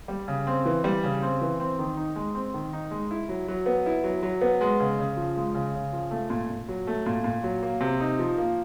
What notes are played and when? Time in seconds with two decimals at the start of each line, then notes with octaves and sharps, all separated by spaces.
0.08 G3
0.28 C#3
0.47 C4
0.66 E3
0.84 G3
1.04 C#3
1.22 C4
1.41 E3
1.60 C4
1.79 D#3
1.97 D#4
2.16 G#3
2.34 C4
2.54 D#3
2.73 D#4
2.91 G#3
3.11 E4
3.29 F#3
3.48 F#3
3.66 B3
3.86 E4
4.04 F#3
4.23 F#3
4.41 B3
4.61 G#3
4.80 C#3
4.99 C#3
5.17 F3
5.37 G#3
5.54 C#3
5.74 C#3
5.93 F3
6.11 A3
6.30 A#2
6.50 A#2
6.69 F#3
6.87 A3
7.06 A#2
7.24 A#2
7.44 F#3
7.62 A#3
7.81 C3
8.00 D#4
8.19 F3
8.38 A#3